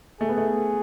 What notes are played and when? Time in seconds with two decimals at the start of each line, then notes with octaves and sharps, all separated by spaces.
0.21 A3 G#4
0.29 B3
0.37 A3